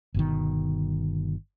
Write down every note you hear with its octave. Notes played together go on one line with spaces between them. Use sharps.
G1 B2 D#3